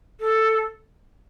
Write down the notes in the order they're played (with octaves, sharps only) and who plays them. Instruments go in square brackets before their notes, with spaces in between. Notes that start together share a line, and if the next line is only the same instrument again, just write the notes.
[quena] A4